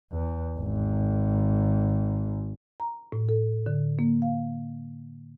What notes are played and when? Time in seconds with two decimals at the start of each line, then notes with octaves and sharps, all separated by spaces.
0.12 E2
0.58 G#1
2.80 A#5
3.12 A2
3.29 A4
3.66 D3
3.99 A#3
4.22 F5